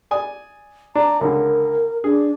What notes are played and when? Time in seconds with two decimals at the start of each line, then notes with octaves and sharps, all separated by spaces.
0.11 D5 G#5 D#6
0.95 D4 A#5
1.21 C#2 D3 A#4
2.04 D4 G#4